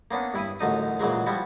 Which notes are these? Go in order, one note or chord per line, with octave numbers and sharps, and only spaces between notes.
A#3 B3 C#4 D4
G2 E4 B5 D#6
A1 F#2 D3 D#4 D#6
A#2 C#3 E3 F#3 G#3
F3 G3 E4 F#4